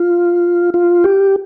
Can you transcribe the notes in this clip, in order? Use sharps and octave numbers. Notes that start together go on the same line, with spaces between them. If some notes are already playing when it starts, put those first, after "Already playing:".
Already playing: F4
F4
G4